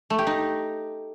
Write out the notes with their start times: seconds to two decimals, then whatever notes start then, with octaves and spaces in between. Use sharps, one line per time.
0.10 A3
0.18 G4
0.27 D#4